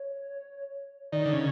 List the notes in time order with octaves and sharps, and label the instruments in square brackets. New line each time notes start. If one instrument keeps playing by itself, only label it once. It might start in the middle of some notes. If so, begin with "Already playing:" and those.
Already playing: [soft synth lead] C#5
[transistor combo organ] D#3 [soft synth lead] D5
[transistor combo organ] D3
C#3